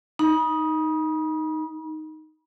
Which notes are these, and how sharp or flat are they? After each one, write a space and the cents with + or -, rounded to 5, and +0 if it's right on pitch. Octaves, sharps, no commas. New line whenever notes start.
D#4 +0 B5 -40